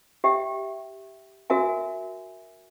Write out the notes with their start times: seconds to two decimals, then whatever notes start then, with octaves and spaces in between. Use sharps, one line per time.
0.24 G4 E5 G5
1.50 F#4 A#4 E5 G#5